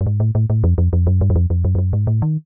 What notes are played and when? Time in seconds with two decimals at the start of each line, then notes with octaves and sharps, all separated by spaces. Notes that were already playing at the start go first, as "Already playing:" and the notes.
0.01 G2
0.07 G#2
0.20 A2
0.35 A2
0.50 A2
0.64 F2
0.78 F2
0.93 F2
1.07 F#2
1.21 G2
1.30 F#2
1.36 F2
1.50 F2
1.65 F#2
1.75 F2
1.78 F#2
1.93 G#2
2.07 A2
2.22 D#3